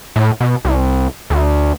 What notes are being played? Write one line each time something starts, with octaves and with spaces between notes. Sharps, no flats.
A2
B2
C2
D2